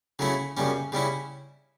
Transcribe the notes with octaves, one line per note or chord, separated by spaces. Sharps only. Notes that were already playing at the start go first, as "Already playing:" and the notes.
C#3 F#3 A3 C#4 E4
F#2 C#3 G3 C#4
C#3 G3 C#4 E4